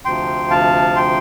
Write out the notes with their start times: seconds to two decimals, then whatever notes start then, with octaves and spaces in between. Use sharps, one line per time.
0.05 D2 C3 F3 G5 C6
0.50 F5 A5
0.96 G5 C6